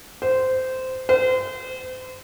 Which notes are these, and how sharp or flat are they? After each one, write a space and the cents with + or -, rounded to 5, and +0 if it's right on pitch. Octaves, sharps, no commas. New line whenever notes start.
C5 -15
C5 -35